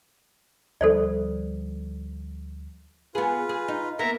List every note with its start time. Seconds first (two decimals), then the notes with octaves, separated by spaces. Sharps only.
0.81 D2 F3 G3 A4 C5 D5
3.15 B3 F4 G#4 B4
3.49 G#4
3.68 D#4
3.99 A#3 B3 E5 A#5